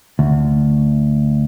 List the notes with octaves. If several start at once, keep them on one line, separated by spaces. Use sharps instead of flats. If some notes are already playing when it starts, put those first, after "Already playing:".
D2